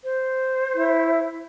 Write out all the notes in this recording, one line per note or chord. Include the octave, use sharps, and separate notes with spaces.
C5
E4